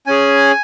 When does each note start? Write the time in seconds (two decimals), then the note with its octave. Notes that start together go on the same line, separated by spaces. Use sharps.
0.06 C#4 G#4 G#5